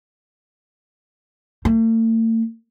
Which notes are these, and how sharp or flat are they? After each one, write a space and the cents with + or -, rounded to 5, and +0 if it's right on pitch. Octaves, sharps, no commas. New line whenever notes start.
A3 +45